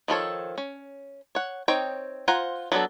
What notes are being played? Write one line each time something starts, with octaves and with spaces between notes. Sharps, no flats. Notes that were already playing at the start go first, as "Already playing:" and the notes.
D#3 F3 A4 C#5
C#4
C#5 F#5
C4 D#4 C#5 G5
F4 C5 F#5 G#5 A#5
F#3 B3 C4 D4 A4